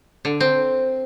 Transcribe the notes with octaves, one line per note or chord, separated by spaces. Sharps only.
D3
C4